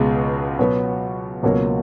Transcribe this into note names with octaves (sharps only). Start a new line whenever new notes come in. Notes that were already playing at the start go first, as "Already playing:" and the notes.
Already playing: C#2 B2 G#3
B2 F#3 B3
C#2 B2 F#3 A#3